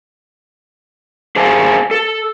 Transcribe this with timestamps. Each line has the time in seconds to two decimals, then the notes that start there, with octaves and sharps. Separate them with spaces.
1.36 G#4 C5 F5 G#5 A5
1.91 A4